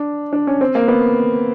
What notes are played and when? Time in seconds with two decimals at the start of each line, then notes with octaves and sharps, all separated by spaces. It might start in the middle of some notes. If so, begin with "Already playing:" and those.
Already playing: D4
0.33 D4
0.47 C#4
0.61 C4
0.75 A#3
0.88 B3